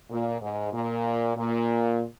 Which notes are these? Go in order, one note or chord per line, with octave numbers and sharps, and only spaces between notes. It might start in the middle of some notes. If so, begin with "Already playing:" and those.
A#2
G#2
A#2
A#2